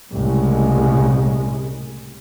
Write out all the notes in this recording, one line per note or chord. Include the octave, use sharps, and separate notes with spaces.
C2 A2 C#3 G#3